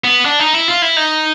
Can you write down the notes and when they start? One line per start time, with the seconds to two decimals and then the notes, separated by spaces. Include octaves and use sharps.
0.04 B3
0.26 D4
0.40 D#4
0.54 E4
0.68 F4
0.82 E4
0.96 D#4